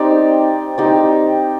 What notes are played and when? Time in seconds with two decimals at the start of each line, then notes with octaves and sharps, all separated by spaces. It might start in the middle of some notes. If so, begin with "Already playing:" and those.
Already playing: C4 D#4 G4 D5
0.78 C4 D#4 G4 D5